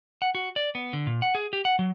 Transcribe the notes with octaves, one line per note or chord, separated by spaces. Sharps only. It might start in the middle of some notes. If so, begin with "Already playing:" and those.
F#5
F#4
D5
B3
D3
A#2
F#5
G#4
G4
F#5
F#3